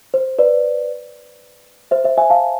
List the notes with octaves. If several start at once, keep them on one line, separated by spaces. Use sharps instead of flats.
C5
B4 D5
C5 E5
C5 E5
E5 G#5
F5 A5